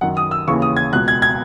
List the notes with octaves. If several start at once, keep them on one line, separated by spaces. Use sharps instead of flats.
F#2 D#3 F#5
D#6
E6
D#2 C#3 E3 C#6
D#6
G#6
C#2 B2 F#6
G#6
G#6